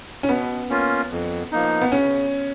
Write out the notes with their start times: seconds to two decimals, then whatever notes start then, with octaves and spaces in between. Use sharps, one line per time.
0.23 C#4
0.28 B2 B3
0.70 A#3 C#4 F4
1.10 F2
1.52 F3 A#3 D#4
1.82 B3
1.92 C#3 C#4